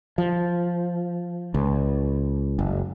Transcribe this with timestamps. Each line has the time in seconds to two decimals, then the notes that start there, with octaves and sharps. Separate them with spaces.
0.18 F3
1.54 C#2
2.59 F#1